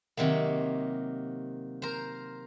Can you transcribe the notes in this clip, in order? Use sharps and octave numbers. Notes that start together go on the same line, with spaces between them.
C3 D#3 F#3 A#3
A#4 C5